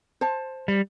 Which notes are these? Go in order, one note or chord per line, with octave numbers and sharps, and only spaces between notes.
C5 A5
G3